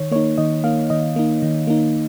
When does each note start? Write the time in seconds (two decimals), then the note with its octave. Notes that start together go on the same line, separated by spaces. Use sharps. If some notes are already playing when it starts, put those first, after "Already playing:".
Already playing: D#3 C#5
0.12 A#3 D#4 C#5
0.38 D#3 D#5
0.64 A#3 D#4 F5
0.90 D#3 D#5
1.16 A#3 D#4
1.42 D#3
1.67 A#3 D#4